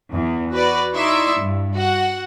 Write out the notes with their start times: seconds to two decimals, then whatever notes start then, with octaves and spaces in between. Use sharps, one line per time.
0.12 E2
0.52 F#4 B4 D5
0.95 D#4 E4 D5 E5 C6 C#6
1.38 G2
1.75 F#4 F#5